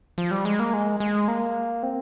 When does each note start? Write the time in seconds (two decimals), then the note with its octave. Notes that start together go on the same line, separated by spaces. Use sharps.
0.18 F3
0.31 G3
0.45 G#3
0.60 A#3
0.73 G#3
1.00 G#3
1.28 A#3
1.83 C4